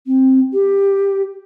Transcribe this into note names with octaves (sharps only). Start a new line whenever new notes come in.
C4
G4